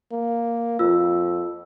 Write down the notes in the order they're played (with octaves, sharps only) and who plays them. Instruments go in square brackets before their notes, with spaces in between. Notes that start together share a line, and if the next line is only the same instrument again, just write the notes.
[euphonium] A#3
[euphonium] F2 [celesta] F4 E6